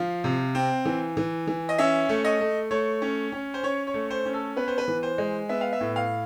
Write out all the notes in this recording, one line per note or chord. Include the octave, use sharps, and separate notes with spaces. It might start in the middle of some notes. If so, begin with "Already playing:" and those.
Already playing: F3 F5
C3
C4
E3
E3
E3
D#5
C#4 E5
A3
D#5
A3
A3 C#5
C#4
C#4
C5
C#4 C#5
C#5
A3
C5
C#4
A4
B3 B4
C5
B4
E3
C5
G#3
B3 E5
F5
E5
A2
F5